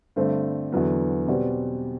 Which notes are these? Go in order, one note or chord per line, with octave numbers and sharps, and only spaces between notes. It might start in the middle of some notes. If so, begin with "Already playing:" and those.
G2 D3 A3 C4 C5
E2 D3 F#3 B3
B2 G3 C4 D5